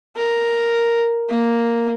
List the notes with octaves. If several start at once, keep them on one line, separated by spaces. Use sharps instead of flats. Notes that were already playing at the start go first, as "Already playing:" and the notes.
A#4
A#3